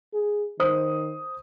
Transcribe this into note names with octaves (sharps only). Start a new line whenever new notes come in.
G#4
D#3 C5 D#6